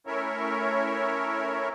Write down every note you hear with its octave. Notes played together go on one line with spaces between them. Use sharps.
A3 C#4 E4 A#4 C#5 E5